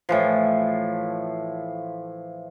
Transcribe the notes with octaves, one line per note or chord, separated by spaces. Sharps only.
A2 E3 F3